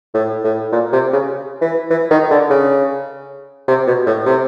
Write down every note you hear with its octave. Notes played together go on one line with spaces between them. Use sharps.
A2
A2
A#2
C3
C#3
E3
E3
D#3
D3
C#3
C3
B2
A2
C3